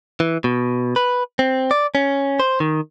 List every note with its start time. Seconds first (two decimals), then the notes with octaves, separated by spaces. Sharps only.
0.20 E3
0.44 B2
0.96 B4
1.39 C4
1.71 D5
1.95 C#4
2.40 C5
2.60 D#3